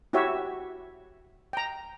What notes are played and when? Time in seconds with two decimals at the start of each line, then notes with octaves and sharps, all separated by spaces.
0.13 E4 F#4 G4 C#5 E5
1.53 G5 A#5